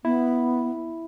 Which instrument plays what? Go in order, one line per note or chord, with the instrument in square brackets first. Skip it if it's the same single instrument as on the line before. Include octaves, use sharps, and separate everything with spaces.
[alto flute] B3 [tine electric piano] E4